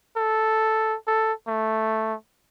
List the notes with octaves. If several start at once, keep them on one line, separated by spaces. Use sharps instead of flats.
A4
A4
A3